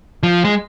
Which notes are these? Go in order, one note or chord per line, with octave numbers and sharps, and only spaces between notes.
F3
G#3